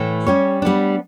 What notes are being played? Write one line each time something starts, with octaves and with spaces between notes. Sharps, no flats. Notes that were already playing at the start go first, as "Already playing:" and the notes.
Already playing: A2 E3 A3
G3 C#4 G4 C#5
G3 B3 D4